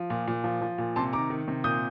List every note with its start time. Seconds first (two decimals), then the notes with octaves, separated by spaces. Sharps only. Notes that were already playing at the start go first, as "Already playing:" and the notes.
Already playing: F3
0.10 A#2
0.28 A#2
0.44 F3
0.61 F3
0.78 A#2
0.96 C3 A5 C6
1.13 D#3 A#5 D6
1.30 D#3
1.48 C3
1.64 A#2 D#6 G6